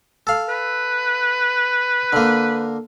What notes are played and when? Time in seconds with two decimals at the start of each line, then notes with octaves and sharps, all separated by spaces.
0.27 A4 F5
0.49 B4
2.13 D3 A#3